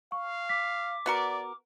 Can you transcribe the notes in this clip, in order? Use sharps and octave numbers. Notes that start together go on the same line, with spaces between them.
F5 C#6
D6 B6
B3 F#4 A#4 D5